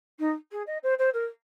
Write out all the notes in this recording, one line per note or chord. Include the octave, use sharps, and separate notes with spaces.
D#4
G#4
D#5
C5
C5
A#4